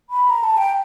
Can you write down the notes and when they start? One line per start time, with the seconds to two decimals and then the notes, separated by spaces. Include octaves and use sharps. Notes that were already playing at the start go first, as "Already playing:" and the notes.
0.10 B5
0.30 A#5
0.44 A5
0.57 G5